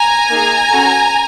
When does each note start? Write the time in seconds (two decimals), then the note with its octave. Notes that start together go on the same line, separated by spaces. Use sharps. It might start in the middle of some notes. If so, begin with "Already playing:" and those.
Already playing: G#5 A#5
0.30 A#3 D#4 G#4
0.71 C#4 F#4 A4